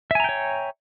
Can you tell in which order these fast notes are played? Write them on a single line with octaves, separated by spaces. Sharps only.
E5 G#5 A#5 G5 C#5